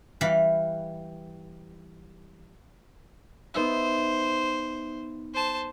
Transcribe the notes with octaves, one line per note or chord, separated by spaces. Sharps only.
E3 G3 F5 B5
B3 D#4 C5 E5
C5 A5